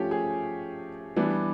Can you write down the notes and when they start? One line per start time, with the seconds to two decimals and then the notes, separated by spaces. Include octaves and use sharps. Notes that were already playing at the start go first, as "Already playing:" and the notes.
Already playing: F3 A3 C#4 G4
0.11 G#4
1.16 E3 G3 B3 D4